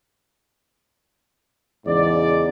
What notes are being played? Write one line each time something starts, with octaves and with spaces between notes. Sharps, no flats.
E2 G#2 C#3 D5